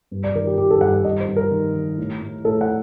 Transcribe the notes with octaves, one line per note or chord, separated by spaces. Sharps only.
G2
D5
D#3 A#4
G4
D#3 G4
A4
G2 F#5
F#5
G2 D#5
C5
G2
A#4
D#3
D#3
A2
A2
A2 A4
F#5